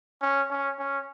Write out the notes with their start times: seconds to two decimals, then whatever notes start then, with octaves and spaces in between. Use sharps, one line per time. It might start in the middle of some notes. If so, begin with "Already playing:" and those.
0.22 C#4
0.50 C#4
0.79 C#4